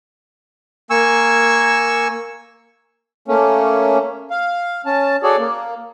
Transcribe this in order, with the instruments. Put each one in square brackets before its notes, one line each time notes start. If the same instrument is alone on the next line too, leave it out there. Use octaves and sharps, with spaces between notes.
[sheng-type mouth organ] A#3 G#5 C#6 E6
[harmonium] A3 A#3 C#4
F5
C#4 A5
F#4 G#4 A4 C#5 D5
A#3